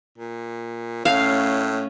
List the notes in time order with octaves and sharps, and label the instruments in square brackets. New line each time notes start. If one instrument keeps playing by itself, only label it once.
[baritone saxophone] A#2
[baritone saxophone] A2 [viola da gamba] A3 C#4 [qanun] F5